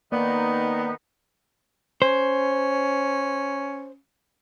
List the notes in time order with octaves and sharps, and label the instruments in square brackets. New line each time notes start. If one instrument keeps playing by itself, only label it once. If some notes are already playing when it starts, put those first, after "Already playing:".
[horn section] D#3 B3 D#4 [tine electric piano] A#3 D5
[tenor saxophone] C#4 [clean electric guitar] C5